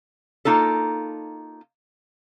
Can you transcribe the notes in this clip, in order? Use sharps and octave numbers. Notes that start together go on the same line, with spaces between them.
A#3 D#4 F4 A4